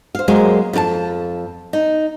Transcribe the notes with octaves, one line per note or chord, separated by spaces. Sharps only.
C5 F5
F#3 G#3 A#3 C#4 A#4 C5
F2 F4 A5
D#4